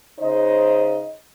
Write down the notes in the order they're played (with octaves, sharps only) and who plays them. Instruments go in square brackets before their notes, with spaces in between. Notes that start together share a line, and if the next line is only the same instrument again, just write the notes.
[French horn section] C#3 D#4 C5 D#5